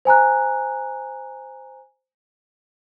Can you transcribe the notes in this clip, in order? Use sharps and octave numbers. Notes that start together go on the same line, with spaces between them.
C5 G#5 A#5 F#6